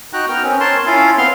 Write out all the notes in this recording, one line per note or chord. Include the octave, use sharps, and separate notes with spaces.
D#4 F#4 G5 A#5 F#6
B3 A#4 G5 F6
C4 C#4
A#4 C#5 A5 C6
C#4 E4 F4 F5
B3 C4 F5 C6 F6